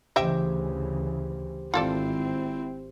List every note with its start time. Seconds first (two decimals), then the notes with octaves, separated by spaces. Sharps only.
0.16 D2 C#3 E3 G4 C5 D#5 E5 G5
1.74 G#1 C4 E4 F4 A4 D5